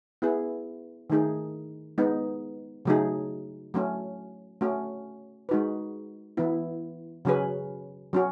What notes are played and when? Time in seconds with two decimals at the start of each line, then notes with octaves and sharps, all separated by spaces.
0.22 B3 E4 G#4
1.10 D#3 A3 D#4 G#4
1.98 G#3 B3 D#4
2.85 C#3 F#3 A3 D#4 G#4
3.74 F#3 A3 C#4
4.61 A3 C#4 F#4
5.49 G#3 D#4 F#4 B4
6.37 E3 B3 E4
7.25 C#3 F#3 C#4 G#4 B4
8.13 F#3 C#4 F#4